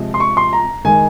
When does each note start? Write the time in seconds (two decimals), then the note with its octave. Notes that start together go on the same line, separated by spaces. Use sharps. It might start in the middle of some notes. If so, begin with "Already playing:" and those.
Already playing: C3 F3 G#3
0.14 C6
0.20 C#6
0.37 C6
0.53 A#5
0.85 D#3 G#3 G#5